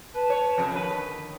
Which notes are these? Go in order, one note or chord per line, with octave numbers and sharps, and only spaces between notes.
B4 A5
C#5
F2 C#3
D3 D#3 B4